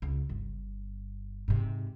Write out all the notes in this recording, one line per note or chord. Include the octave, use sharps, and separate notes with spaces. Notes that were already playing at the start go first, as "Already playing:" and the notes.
C#2
G1
G#2 C3